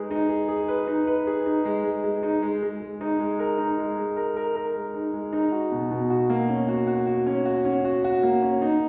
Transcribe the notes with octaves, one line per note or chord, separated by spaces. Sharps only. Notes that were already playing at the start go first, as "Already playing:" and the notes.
Already playing: G#3 D#4 G#4 B4
D#4
G#4
G#4
B4
D#4
B4
G#4
D#4
G#3
G#3
G#3
D#4
G#3
G#3
G#3
D#4
G#3
A#4
D#4
G#3
G#3
A#4
A#4
A#4
G#3
D#4
G#3
D#4
F#4
B2
B2
F#4
A#3
C#4
F#4
F#4
F#4
C#4
F#4
C#4
F#4
F#4
A#3
C#4
D#4